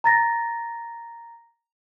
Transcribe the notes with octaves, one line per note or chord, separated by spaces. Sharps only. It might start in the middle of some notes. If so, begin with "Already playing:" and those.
A#5 A6 A#6